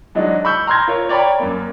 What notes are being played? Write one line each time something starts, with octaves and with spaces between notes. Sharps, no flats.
E3 F#3 G#3 D4 D#4
B5 C#6 E6 G6
A#5 C6 F6 G6 G#6 A#6
F4 A#4 C#5
C#5 D5 G5 A#5 B5 D6
F#2 A#3